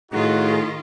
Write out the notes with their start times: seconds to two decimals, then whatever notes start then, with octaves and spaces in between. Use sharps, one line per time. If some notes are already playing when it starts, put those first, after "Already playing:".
0.12 A2 D#3 D#4 F4 F#4 G#4